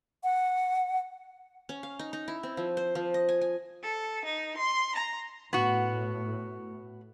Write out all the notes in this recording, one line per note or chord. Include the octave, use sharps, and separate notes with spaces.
F#5
C#4
F5
D#4
D#4
E4
C4
F3
C5
F3
D#5
G#5
G#5
A4
D#4
C6
A#5
A2 B3 F#4